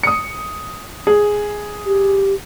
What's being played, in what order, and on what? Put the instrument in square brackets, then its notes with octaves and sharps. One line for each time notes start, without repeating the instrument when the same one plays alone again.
[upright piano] D#6 C#7
G#4
[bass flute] G4